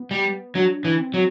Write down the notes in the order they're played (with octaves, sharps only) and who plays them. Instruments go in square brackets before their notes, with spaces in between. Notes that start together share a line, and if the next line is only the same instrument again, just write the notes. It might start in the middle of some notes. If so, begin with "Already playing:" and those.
Already playing: [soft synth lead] B3
[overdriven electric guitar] G3
[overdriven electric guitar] F#3 [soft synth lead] D4
[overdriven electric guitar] E3
[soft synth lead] C4
[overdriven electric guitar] F#3